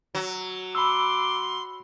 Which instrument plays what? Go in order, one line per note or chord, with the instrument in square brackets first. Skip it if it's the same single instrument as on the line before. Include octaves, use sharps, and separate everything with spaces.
[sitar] F#3
[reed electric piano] B5 E6 [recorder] C6 [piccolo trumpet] D6